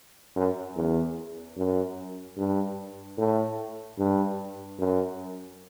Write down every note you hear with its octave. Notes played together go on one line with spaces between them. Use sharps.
F#2
E2
F#2
G2
A2
G2
F#2